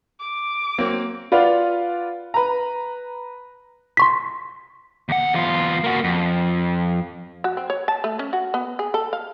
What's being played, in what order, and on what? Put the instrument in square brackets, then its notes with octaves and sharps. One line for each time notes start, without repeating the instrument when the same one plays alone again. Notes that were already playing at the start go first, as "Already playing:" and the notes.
[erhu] D6
[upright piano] F#3 A#3 C4
[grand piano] F4 B4 D5 F5 F#5
B4 A#5
[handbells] C6 C#6 B6
[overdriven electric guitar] D#2 F#5
E2 F4
A#3 F#4
F2
[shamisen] F#4
C4
C#5
A5
A3
C#4
F#4
B3
G#4
A4
F5